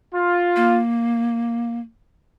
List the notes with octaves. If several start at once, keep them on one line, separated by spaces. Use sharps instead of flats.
F4
A#3